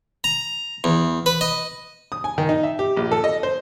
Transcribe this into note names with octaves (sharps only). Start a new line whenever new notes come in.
A#5
E2
B4
D#5
D#6
G#5
D#3
D#4
E5
G4
A#1
A4
D#5
C5